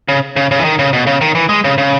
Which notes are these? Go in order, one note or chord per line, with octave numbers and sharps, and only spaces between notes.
C#3
C#3
C#3
E3
D#3
C#3
B2
C#3
D#3
E3
G#3
C#3
C#3